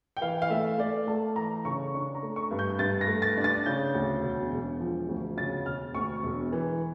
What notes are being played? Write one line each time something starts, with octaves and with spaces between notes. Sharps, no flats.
G5
E3 F5
F5
A3 E5
A3 D5
A3 A5
E3 A#5
C#3 C#6
D4 C#6
A#5
A3
C#6
G2
G6
G2 A6
A#6
A3
A6
D4
A6
C#3 G6
D2
E1
E1
F3
D2
C#3 A6
E1 F6
D2 C#6
E1
E3